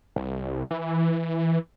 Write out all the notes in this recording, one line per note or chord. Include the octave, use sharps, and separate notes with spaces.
C2
E3